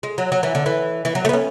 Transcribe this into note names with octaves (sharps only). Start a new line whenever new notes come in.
G#3
F#3
F#3
E3
D3
E3
E3
F#3
A3
B3
C#4